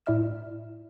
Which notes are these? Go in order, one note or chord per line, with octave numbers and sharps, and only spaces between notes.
A2 E4 D5 E5 F6 E7